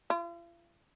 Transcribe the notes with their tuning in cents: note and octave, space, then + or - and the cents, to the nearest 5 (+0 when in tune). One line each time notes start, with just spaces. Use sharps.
F4 -45